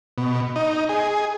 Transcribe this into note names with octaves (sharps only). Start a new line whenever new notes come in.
B2
D#4
G#4